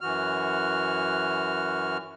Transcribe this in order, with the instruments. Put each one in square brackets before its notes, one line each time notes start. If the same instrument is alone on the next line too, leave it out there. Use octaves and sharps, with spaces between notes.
[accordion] F#2 E3 F#4 F6